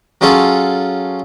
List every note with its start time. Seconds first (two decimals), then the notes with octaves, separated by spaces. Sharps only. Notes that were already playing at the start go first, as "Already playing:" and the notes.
0.21 F#3 C#4 F4 G#4 A4